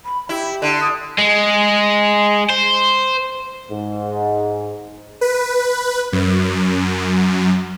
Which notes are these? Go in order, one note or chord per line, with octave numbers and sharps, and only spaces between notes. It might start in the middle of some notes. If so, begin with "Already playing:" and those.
B5
E4 G4
D3
D#6
G#3
C5
G#2
B4
F#2